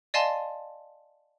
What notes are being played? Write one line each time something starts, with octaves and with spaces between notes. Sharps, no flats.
D5 D#5 F5 G#5 A5 C6